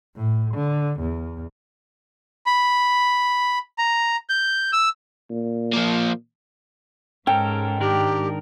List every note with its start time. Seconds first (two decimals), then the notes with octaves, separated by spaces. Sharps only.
0.16 A2
0.54 D3
1.00 E2
2.46 B5
3.78 A#5
4.29 G6
4.73 E6
5.30 A#2
5.74 F3 A#3
7.27 G#2 C#4 A4 A#4 G5
7.80 D#3 D4 G4 A#4